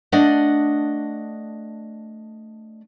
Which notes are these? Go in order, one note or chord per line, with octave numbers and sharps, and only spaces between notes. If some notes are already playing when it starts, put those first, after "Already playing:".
A3 D4 D5 D#5 F#5